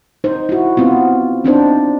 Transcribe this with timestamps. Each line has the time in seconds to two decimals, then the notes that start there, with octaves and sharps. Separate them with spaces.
0.24 D#4 C5
0.49 E4 F#4
0.77 B3 C4 F4
1.44 C4 D4 D#4 C5